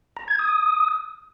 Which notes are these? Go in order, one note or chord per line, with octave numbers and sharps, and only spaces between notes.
A#5
G#6
D#6